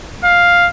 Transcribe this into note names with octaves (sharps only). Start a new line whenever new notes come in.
F5